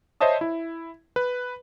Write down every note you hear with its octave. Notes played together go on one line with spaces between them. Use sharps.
C5 C#5 D#5 E5 A5 D#6
E4
B4